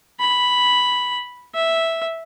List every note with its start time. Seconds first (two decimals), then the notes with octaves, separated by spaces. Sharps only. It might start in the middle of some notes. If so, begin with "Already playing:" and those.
0.20 B5
1.55 E5